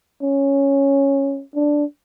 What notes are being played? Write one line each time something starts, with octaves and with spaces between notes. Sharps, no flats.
C#4
D4